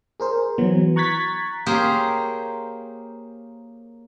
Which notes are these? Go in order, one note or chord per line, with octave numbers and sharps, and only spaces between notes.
G#4 A#4 C5
E3 F#3 B3
A#5 C#6 F#6 G#6 A6 B6
A#3 C#4 G4 G#4 A#4 C5